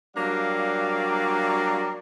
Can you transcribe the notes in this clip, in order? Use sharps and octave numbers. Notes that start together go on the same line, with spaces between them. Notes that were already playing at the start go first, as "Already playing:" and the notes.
F#3 G3 A#3 D4 D5 F5